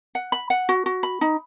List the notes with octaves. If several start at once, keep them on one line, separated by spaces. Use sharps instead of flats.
F#5
B5
F#5
F#4
F#4
B5
D#4